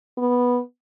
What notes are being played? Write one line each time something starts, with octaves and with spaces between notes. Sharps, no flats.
B3